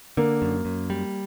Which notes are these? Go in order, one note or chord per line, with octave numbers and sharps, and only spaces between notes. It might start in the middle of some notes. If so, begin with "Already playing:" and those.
D3 A#3
F#2
F#2
G3